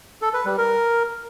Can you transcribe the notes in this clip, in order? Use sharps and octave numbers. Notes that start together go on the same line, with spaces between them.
A4
B4
G3
A#4